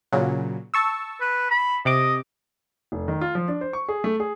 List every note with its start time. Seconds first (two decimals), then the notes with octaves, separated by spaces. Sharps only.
0.12 A#2 C#3 F#3
0.74 A5 C#6 E6
1.21 B4
1.51 B5
1.85 C3 D#5 D6
2.92 F1
3.08 D#3
3.21 F4
3.35 F3
3.48 D4
3.61 C5
3.73 C#6
3.89 G#4
4.04 A3
4.20 G#4